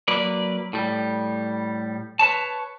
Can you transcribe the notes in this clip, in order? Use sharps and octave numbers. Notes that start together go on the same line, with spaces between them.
F#3 A#3 B4 D5
A2 G3
B4 C#5 A5